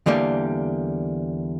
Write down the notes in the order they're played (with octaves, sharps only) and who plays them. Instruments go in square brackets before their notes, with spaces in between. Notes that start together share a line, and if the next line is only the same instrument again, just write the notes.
[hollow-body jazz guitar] E2 D3 G3 A#3